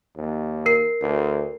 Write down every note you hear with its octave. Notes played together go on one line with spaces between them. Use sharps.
D#2
A#4 C7
D2